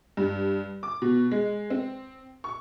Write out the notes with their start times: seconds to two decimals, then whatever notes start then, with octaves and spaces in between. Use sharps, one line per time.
0.17 G2
0.83 D6
1.02 B2
1.31 G#3
1.70 C4
2.44 C#6